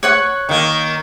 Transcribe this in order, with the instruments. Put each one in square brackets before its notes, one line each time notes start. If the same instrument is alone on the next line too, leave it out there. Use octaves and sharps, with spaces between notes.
[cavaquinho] C#5 F#5 C#6
[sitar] D#3 A#3